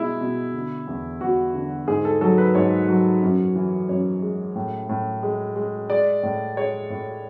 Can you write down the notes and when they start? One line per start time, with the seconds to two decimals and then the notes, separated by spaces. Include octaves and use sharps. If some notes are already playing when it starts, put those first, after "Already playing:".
Already playing: B2 G#3 E4
0.21 B2
0.54 D3
0.88 E2
1.21 E2 F#4
1.54 D3
1.88 G#2 G#4
2.05 A4
2.21 F#3 A4
2.38 B4
2.55 G#2 C#5
2.88 F#3
3.22 F#2
3.55 E3
3.89 F#2 C#5
4.22 G#3
4.55 A2
4.89 A2
5.23 G#3
5.56 G#3
5.90 G#3 D5
6.23 A2
6.57 G#3 C#5
6.90 A2